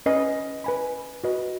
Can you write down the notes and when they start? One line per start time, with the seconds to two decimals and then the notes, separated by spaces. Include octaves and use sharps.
0.06 C#4 B4 D#5 G#5
0.64 B4 G#5 B5
1.24 F#4 B4 D#5